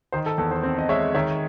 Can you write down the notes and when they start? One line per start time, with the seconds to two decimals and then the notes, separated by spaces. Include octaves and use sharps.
0.12 D#3 C5
0.26 A4
0.38 E2 A4
0.51 C5
0.63 C4
0.79 D#5
0.89 G#3 C#5 E5
1.15 D#3 C#5 E5